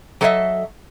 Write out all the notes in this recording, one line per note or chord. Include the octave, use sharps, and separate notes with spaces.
F#3 A4 B4 C#5 D#5 E5